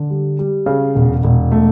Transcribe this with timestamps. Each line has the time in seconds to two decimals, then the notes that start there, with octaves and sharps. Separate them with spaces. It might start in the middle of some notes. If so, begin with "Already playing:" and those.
Already playing: D3
0.10 G3
0.39 G3
0.66 C#3
0.95 E1
1.24 E1
1.52 A3